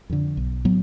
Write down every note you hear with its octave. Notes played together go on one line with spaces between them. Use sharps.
F2 D3
B1
A2 F#3 B3